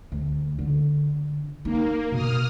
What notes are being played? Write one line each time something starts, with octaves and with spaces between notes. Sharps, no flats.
D2
D3
A#3 D#4
B2 D#6 F6